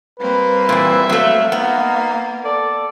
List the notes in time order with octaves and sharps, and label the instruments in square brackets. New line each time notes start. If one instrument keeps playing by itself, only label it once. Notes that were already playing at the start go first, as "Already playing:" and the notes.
[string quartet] G3 A#3 C4 [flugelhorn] B4
[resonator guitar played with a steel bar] A#2 E3 [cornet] E5
[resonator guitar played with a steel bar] F#3 A3 [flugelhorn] F5
[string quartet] A#3 [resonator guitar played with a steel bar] B3 [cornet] D#4
[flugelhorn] A4 [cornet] D5